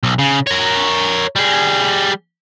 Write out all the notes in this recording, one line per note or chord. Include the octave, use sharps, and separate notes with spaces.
B1
C#3
A#4 C#5
G3 G#4